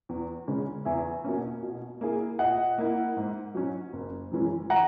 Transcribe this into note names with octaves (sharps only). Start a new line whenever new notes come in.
E2
C#3 G#3 C#4
E2 E5 G#5
B2 A#3 C#4
B2
A#3 E4 G#4
A#2 D#5 F#5
A#3 E4
G#2
F#3 C#4
F#1
F#2 E3 G#3 C#4
F#5 A#5